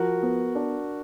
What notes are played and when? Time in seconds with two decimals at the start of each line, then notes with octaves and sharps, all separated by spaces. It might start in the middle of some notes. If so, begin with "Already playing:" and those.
Already playing: F3 F#4 A#4
0.23 B3
0.55 D4